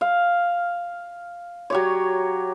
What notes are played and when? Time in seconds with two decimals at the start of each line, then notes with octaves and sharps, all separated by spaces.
0.01 F5
1.70 F#3 G4 C#5